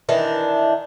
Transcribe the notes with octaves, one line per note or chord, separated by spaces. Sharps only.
D#3 E3 D4